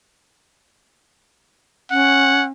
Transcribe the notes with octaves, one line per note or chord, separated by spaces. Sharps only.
C#4 F#5